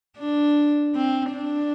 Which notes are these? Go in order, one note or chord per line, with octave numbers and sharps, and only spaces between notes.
D4
C4
D4